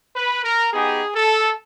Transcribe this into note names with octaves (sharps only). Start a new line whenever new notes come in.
B4
A#4
B3 D#4 G4 G#4
A4